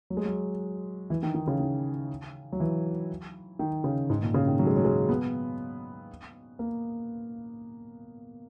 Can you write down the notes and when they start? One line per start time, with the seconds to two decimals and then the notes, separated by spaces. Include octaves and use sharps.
0.10 F#3
0.17 G#3
0.25 F#3
1.10 E3
1.23 D#3
1.35 D#3
1.47 C#3
1.60 D#3
2.52 F#3
2.60 E3
3.59 D#3
3.84 C#3
4.10 G#2
4.22 A#2
4.34 C#3
4.47 D#3
4.59 F#3
4.67 G#3
4.76 F#3
4.85 G#3
5.09 B3
6.59 A#3